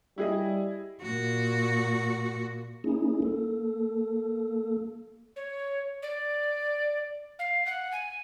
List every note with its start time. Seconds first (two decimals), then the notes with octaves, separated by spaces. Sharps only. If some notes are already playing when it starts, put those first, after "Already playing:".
0.18 G3 E4 G#4 D#5
1.02 A#2 F#4
2.84 A#3 C#4 D#4 E4 G#4
3.22 A#3 A4
5.36 C#5
6.02 D5
7.39 F5
7.66 F#5
7.92 G#5